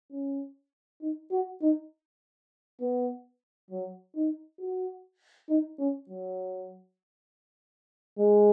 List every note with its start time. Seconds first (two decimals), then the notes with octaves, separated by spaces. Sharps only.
0.11 C#4
1.01 D#4
1.31 F#4
1.61 D#4
2.80 B3
3.71 F#3
4.15 D#4
4.60 F#4
5.49 D#4
5.78 C#4
6.09 F#3
8.18 G#3